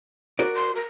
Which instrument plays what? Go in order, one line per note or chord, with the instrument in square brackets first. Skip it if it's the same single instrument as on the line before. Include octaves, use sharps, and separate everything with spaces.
[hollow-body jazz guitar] F#4 A#4 D5
[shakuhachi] C6
A#4